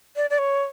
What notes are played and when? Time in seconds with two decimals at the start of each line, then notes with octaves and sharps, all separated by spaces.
0.16 D5
0.30 D5
0.38 C#5